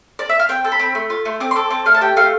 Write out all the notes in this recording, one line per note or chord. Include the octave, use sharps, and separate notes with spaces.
D5
E5
F5
C4 G5
A4
B5
C4
A3
F4
A3
C4 D6
C6
A4 D6
C4 D6
A3 F5
A5
G4 G5
A3 F5